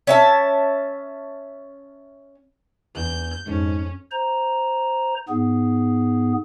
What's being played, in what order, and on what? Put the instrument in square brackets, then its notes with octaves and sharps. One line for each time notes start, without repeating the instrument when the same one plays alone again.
[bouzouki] C#4 E5 A5
[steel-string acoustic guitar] E2 [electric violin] G6
[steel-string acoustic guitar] F2 [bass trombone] G#2 [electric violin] C#4
[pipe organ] C5 A#5
G#2 B3 G#4